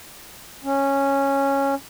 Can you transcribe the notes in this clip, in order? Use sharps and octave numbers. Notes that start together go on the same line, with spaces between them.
C#4